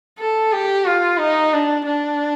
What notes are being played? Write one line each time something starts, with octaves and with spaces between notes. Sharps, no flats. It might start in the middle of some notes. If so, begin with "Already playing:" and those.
A4
G4
F4
D#4
D4
D4